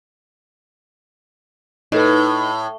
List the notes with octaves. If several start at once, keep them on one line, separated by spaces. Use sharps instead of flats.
A2 D#4 A4 B4